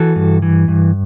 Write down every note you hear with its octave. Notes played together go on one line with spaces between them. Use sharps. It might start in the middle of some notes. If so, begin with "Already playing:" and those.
Already playing: E3 F#4 A4
G2
E3
G2